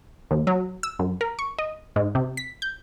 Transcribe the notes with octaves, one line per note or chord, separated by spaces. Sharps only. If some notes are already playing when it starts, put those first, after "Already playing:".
D#2
F#3
E6
F#2
A#4
C#6
D#5
G#2
C3
B6
G6